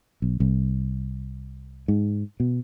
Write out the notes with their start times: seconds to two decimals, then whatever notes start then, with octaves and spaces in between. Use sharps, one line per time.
0.22 B1
0.40 C2
1.88 G#2
2.40 B2